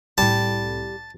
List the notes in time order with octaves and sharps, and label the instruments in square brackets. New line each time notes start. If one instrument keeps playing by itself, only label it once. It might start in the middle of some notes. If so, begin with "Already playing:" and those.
[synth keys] C2 A2 [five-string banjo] G3 [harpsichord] A5